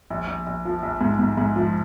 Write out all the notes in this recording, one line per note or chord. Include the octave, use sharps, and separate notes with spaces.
A#1
A#1
A#1
F3
A#1
G#2
G#2
G#2
F3